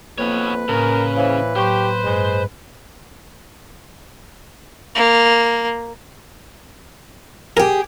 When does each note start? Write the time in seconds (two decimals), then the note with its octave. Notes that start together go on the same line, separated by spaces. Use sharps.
0.18 F2 A#3 B3 B4 C#5
0.68 A2 C#3 A#4
1.16 E3 C5 C#5 F5
1.56 A2 F#3 G4 C5 C6 C#6
2.04 G2 G#3
4.95 A#3
7.57 G4 G#4 A#4